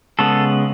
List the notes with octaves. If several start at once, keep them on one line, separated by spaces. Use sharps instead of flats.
C#3 G#3 B3 A4